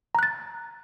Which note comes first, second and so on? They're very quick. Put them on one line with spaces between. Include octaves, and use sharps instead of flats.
A#5 F#6 A6